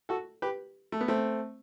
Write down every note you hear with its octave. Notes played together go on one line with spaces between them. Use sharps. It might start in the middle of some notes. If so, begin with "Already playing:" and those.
F#4 A4
G4 B4
A3
B3
A3 C4